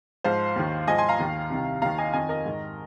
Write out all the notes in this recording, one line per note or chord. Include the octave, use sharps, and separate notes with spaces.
G#2 F3 C5 F5
D#2 D#3
G#2 F3 D#5 G#5
G#5 C6
F5 A#5
D#2 D#3
C2 C3 D#3
D#2 D#3 F5 A#5
D#5 G#5
F2 D#3 D#5 G#5
A#4 D#5
G#2 D#3